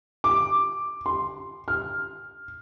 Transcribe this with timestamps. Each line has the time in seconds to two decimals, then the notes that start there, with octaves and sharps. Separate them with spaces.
0.24 D6
1.06 C6
1.68 F6